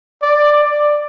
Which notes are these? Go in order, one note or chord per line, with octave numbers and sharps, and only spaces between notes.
D5
D5